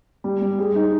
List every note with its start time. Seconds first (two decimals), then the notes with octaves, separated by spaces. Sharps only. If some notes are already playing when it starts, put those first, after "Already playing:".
0.24 G3
0.42 G3
0.59 G#4
0.75 D#4